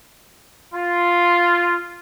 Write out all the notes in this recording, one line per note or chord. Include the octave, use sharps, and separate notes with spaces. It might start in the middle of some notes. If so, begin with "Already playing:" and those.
F4